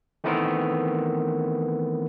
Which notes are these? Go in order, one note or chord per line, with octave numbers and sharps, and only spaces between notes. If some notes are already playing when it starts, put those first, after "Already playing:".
D#3 E3 A3 B3 C4 A#4